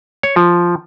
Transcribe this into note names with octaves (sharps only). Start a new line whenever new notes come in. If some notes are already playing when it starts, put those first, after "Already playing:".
C#5
F3